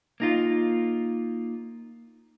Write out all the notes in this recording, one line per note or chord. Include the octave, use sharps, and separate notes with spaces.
A#3 D#4 F4